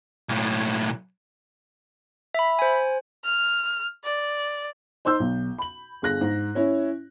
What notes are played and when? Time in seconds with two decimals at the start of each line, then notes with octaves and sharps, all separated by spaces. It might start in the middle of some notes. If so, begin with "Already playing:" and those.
0.29 B1 A2
2.34 E5 B5
2.59 C5 G#5
3.24 F6
4.04 D5
5.05 D#4 C5 C6 E6 G6
5.20 B1
5.58 B5 F#7
6.02 G1 G#4 F#6 A#6
6.21 G#2
6.55 C#4 E4 C#5